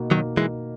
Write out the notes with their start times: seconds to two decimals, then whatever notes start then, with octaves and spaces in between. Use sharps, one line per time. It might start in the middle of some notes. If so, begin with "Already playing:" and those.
Already playing: B2 A#3 D#4
0.11 B2 D#3 F#3 A#3 D#4
0.37 E3 G#3